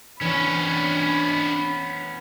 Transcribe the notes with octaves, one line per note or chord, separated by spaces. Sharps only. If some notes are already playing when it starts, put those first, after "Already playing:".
E3 B3 C#4 D4 C#5 B5 F#6